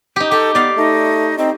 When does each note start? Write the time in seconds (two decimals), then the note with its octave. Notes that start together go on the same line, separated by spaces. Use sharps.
0.16 D#4 G4
0.31 G4 A4
0.55 B3 D5 F5
0.77 A3 D#4
1.38 C4 D#4